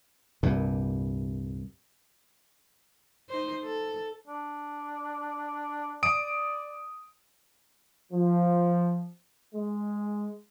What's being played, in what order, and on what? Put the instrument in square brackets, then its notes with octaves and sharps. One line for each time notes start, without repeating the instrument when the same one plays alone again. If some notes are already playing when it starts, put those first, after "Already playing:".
[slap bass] C2 G2 A#2
[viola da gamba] D#4 C5
A4
[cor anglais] D4
[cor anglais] D5 [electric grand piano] D#6 D7
[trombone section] F3
G#3